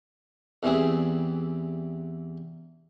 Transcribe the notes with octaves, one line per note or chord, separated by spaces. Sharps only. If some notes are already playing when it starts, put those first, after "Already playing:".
E2 E3 G3 C4 G#4